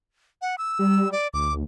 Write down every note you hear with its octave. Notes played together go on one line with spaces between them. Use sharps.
F#5
E6
G3
D5
D2 D6